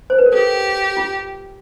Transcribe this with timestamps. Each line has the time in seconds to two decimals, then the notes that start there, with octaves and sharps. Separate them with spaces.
0.10 C5
0.18 B4
0.26 A#4
0.33 G4 A4
0.97 F4